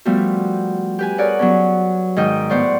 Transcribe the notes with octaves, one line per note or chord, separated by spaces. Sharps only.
F3 G3 A3 B3 F#4
G4 B4 G#5
G#4 A#4 C#5 D5 F#5
F#3 B3 C#4
G#2 D#3 D#5 G5
A2 B3 C5 D5 F#5 C#6